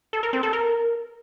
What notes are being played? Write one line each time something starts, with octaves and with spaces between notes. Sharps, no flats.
A4
A#4
C4
A4
A#4